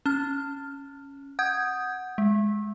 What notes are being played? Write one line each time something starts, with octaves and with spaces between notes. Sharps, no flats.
C#4 F6
F#5 D#6 G6 G#6
G#3